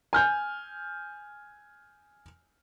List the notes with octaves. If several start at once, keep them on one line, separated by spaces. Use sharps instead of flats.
G#5 F6 G6